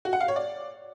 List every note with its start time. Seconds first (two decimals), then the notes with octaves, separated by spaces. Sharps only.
0.05 F#4
0.13 F#5
0.21 F5
0.28 C#5
0.36 D5